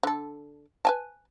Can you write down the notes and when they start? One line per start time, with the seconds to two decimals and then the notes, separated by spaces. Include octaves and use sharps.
0.03 D3 A4
0.85 B4 G#5 A5